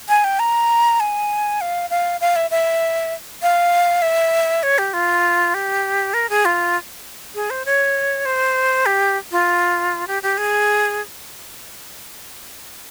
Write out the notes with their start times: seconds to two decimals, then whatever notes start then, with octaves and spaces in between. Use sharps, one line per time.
0.09 G#5
0.24 G5
0.39 A#5
1.00 G#5
1.61 F5
1.90 F5
2.21 F5
2.36 E5
2.51 E5
3.42 F5
4.02 E5
4.63 C#5
4.78 G4
4.93 F4
5.54 G4
6.14 A#4
6.30 G#4
6.45 F4
7.35 G#4
7.50 C5
7.66 C#5
8.25 C5
8.86 G4
9.31 F4
10.07 G4
10.23 G4
10.38 G#4